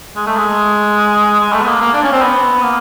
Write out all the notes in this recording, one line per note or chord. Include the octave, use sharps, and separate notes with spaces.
G#3
A3
G#3
G#3
A3
B3
A#3
A#3
D4
C#4
C4
B3
A#3